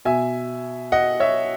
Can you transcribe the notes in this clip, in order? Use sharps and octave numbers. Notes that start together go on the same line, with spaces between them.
B2 E5 G#5
D#5 F#5
C#5 E5